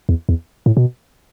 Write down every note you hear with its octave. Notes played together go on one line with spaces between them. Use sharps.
E2
E2
A2
B2